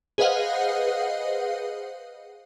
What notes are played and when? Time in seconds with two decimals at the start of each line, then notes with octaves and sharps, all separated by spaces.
0.18 G#4 B4 C5 D#5 F5 F#5